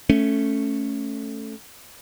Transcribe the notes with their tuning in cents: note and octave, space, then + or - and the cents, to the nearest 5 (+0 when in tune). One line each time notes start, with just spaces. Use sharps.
A3 +0 C#4 -5